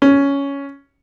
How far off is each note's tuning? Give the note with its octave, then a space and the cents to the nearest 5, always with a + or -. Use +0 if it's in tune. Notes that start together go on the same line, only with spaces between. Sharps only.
C#4 +10